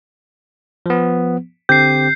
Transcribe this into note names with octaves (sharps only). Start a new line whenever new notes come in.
F3 B3
D3 C4 G4 G6 C7